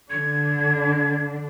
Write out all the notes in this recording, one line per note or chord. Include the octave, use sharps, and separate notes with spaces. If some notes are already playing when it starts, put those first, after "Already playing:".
D3 D4 G#6